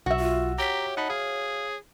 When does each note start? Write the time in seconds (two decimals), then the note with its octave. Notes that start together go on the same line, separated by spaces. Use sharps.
0.06 B1 F#4 E5
0.20 F4
0.58 G4 C#5 A#5 B6
0.97 D#4 F#5 A5 B5
1.10 G#4 F5